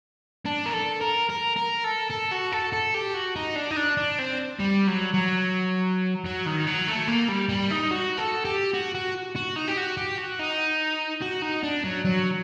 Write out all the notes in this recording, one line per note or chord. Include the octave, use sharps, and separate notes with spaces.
D4
A#4
A4
A#4
A#4
A#4
A4
A4
F#4
A4
A4
G4
F#4
D#4
D4
D#4
D4
D4
C4
G3
F#3
F#3
F#3
D#3
F#3
A3
A#3
G3
G3
D#4
F#4
A4
G4
F#4
F#4
F#4
D#4
G4
F#4
G4
F#4
D#4
F#4
D#4
D4
F#3
F#3